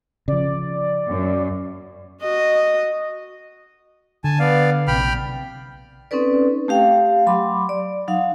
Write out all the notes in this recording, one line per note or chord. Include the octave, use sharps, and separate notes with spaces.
C#3 F3 D5
F#2
F#4 D#5
D3 G#5 A5
B3 D5 F5
A#1 C3 G5 B5 F6
C4 C#4 D#4 A4 B4 D5
A3 G4 F5 G5
F#3 B5 C6 D6
D5
F#3 D#4 F5 F#5